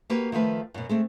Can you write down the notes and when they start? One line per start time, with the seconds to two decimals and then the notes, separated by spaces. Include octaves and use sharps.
0.10 A#3 F#4 G4 B4
0.32 D#3 F3 A3 B4
0.74 F#2 B2
0.89 G#3 A3 C4